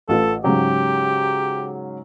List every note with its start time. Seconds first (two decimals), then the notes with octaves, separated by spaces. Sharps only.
0.09 A1 F4 A4 B4
0.44 G#2 C#3 F#3 G4